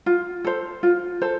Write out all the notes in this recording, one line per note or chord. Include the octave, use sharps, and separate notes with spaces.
F4
A4 C5
F4
A4 C5